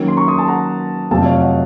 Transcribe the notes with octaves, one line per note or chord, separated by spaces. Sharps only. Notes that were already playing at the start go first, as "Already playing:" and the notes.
Already playing: D#3 F#3 A#3 C#4
C6
A#5 C#6
C6 D#6
A5 C6
F#5 A#5
F2 C3 F#3 A3 F5 A5
C#5 F5
D#5 F#5